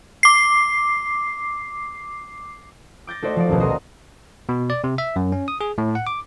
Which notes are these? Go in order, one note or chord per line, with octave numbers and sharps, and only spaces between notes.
D6 C7
D6 G6 A6 A#6
A3 D#4 F#4 C5 D5
F3 D5
D#1 B1 B2
F#4 D#5 A#5 C6
B2
D5
C3
E5
F#2
C#4
D#6
G#4
A2
F#5
D6